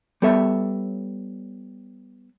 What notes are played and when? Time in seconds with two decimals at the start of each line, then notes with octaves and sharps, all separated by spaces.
0.22 G3 B3 A4 C#5 E5